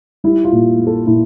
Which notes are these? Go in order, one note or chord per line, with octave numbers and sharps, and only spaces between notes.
G3 E4
F4
A#2
G3
A4
A#2 E4